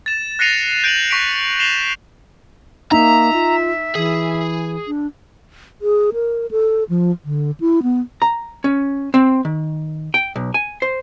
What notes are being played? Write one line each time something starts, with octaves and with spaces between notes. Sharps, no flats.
A6 E7
F#6 A#6 C7 C#7 D#7 F7
G6 D7 D#7 F7 F#7
C#6 B6 D7 F7
C7 E7 F7 G7
A#3 D#4 E5 A#5
F4
E3 G#4
D4
G#4
A#4
A4
F3
D3
E4
B3
A#5
C#4
C4
D#3
G5
B1
G#5
C5